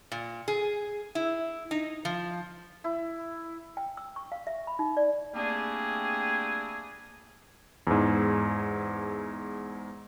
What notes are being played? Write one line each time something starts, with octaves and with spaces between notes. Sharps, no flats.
A#2
G#4
E4
D#4
F3
E4
G5
E6
C#6
F5
E5
B5
D#4
D5
G3 A3 A#3 C4 D4 G#4
E2 G#2